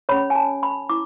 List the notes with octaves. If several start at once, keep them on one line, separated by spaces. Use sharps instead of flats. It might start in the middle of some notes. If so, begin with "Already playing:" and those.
C#4 G#4 C#5 B5
G#5
A5
B5
E4 D6